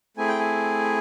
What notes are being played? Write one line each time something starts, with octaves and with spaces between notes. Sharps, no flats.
A3 C4 E4 G#4 G#5
G5
G#5